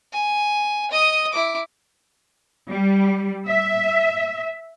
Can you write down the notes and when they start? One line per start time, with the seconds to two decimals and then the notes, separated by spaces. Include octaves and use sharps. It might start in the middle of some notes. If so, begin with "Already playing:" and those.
0.13 G#5
0.91 D#5 D#6
1.33 E4 D6
2.71 G3
3.46 E5